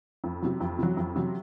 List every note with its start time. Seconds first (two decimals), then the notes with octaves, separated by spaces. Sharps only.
0.24 F2
0.42 C3 F#3
0.60 F2
0.79 C3 F#3
0.97 F2
1.16 C3 F#3